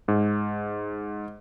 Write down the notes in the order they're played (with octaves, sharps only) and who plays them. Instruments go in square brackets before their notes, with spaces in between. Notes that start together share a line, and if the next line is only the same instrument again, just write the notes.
[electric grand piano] G#2